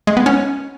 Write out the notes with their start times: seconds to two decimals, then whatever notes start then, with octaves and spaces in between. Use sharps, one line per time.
0.07 G#3
0.17 B3
0.26 C#4